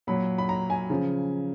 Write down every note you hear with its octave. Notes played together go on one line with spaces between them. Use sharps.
A#2 F#3 B5
B5
A#5
G#5
C#3 F3